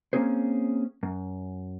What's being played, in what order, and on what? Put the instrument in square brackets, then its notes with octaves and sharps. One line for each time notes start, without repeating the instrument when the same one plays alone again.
[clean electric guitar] A#3 C4 C#4 G#4 C5
F#2